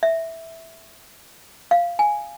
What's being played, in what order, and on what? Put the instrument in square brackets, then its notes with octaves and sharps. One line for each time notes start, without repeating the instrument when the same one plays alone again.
[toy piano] E5
F5
G#5